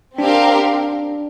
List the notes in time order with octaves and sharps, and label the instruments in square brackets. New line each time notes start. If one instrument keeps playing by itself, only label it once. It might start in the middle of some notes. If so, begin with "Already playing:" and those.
[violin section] C4 G4 A#4 F5 [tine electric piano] D4